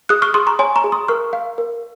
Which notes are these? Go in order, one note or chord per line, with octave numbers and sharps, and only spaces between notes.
G#4 D#6 F#6
C#6 F6
G#4 C6 D#6
A#5 C#6
C#5 G#5 C6
A#5 C#6
G#4
C6 D#6
A#4 C#6 F6
F5
A#4